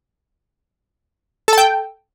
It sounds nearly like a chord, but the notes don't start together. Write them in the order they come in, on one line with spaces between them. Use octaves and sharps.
A4 A5 G5